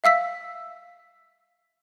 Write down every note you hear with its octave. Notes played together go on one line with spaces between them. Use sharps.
E5 F5 E6 B6